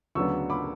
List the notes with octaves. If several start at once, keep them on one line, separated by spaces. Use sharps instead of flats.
D2 C#3 F#3 B3 D4 C#6 E6
B5 D6